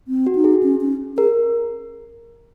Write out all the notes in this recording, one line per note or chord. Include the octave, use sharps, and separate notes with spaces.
C4
F#4
D#4
G#4
C#4
C#4
G#4 A#4